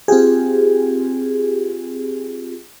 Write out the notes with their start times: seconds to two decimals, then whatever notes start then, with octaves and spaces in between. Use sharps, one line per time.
0.08 C4 F4 G4 G#4